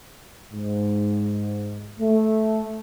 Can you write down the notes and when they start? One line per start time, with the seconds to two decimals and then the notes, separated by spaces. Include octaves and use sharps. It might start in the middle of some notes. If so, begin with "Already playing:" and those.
0.52 G#2
1.99 A3